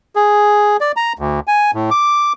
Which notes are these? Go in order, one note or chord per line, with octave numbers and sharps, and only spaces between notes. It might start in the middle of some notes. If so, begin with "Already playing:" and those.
G#4
D5
A#5
D2
G#5
A2
D6